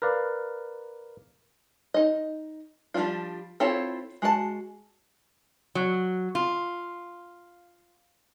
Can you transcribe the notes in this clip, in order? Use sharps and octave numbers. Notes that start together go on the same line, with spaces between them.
A#4 B4 D5 F5
D#4 D#5
F3 G3 C#4 D4 F4
C4 E4 F4 A4 C#5
G#3 F#4 C5 A5
F#3
F4